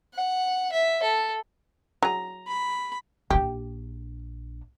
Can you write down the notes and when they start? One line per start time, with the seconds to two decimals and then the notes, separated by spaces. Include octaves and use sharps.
0.14 F#5
0.72 E5
1.03 A4
2.03 F#3 G#4 A#5
2.48 B5
3.30 A#1 D4 G4